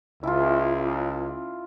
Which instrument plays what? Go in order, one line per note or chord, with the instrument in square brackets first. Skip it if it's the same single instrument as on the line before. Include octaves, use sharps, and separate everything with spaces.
[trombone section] C#2 [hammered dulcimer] E4 F4